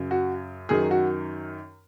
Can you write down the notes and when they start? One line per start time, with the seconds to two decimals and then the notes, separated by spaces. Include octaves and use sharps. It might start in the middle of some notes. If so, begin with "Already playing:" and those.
Already playing: F#2 C#3 F#3
0.11 F#4
0.69 F#2 D#3 F#3 G#4
0.91 F#4